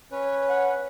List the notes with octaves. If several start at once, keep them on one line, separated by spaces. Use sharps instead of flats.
C#4 B4 C#5
F#5